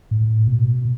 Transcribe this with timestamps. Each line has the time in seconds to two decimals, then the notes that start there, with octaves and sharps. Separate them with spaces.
0.11 A2
0.47 B2